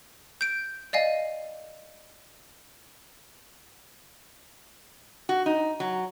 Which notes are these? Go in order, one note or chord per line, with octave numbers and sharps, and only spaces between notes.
G6 D7
D5 D#5 F5 G#5
F#4
D#4
F#3